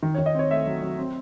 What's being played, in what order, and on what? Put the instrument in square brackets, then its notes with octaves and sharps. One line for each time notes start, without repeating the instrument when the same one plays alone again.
[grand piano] D#3
C#5
D#3
D#5
C4 C#5
A3 E5
F#3
F#3
C4